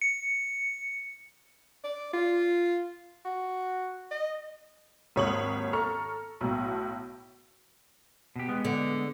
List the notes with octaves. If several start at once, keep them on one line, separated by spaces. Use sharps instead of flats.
C#7
D5
F4
F#4
D#5
G#1 D#2 C#5 D#6 F6 F#7
A4 A#5 C#6 F6
B1 A2
B2 G4
G#3 B3
D3